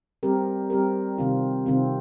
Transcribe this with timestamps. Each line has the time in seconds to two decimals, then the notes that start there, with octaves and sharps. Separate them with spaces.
0.23 G3 C4 G4 A#4
0.70 G3 C4 G4 A#4
1.18 C3 D#3 C4 F4
1.66 C3 D#3 C4 F4